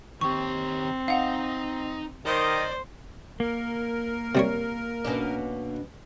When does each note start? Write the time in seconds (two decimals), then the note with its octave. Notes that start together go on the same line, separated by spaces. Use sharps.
0.21 D#3 C4 G4 C#6
1.08 D#4 F5 F#5
2.26 D#3 C5 D5 D#5
3.40 A#3 A#4
4.35 C3 G3 C#5
5.04 B2 C#4 D4